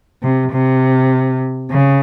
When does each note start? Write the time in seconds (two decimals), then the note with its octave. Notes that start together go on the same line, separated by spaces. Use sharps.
0.23 C3
0.52 C3
1.71 C#3